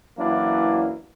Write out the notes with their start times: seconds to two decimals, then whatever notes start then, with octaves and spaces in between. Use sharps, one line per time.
0.18 F#2 E3 F#3 A#3 D4 E4